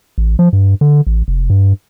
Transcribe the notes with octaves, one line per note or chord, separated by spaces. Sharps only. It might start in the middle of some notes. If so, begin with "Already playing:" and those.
A1
F3
G2
D3
A1
F1
G2